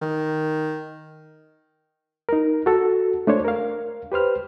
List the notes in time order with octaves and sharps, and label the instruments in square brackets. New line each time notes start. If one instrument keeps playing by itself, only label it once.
[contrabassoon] D#3
[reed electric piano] D#4 A#4
F#4 A4
A3 D4 C5 C#5
A#4 F5
G4 B4 C5 F6